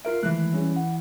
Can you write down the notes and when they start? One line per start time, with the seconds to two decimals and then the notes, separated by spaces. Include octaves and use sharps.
0.05 F4 A#4 E5 C7 D7
0.23 D#3 E3 G#3 A3 F#6
0.53 G3 C#4 G#4
0.76 F#5